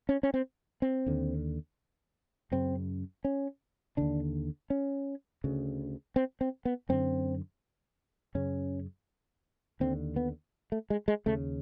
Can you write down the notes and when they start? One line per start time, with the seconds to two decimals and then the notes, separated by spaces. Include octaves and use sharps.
0.09 C#4
0.23 C#4
0.34 C4
0.82 C4
1.06 D#2 D3
2.52 F#2 C#3 C4
3.25 C#4
3.97 D#2 D3 D4
4.70 C#4
5.44 D2 C#3
6.16 C4
6.41 C4
6.65 B3
6.89 F#2 D3 C4
8.35 F#2 C#3 C#4
9.80 D#2 D3 C4
10.16 B3
10.72 A3
10.90 G#3
11.08 G#3
11.26 D#2 C#3 A3